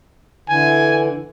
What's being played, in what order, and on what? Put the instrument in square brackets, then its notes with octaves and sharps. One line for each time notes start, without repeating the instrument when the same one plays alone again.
[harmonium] D3 E3 [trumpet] G#5